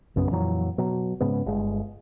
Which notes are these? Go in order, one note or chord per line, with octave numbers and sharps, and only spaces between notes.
A#1 F#2 C#3 B3
F2 A#2 E3 F#3
B2 F#3
G#2 C#3 B3
G1 G#3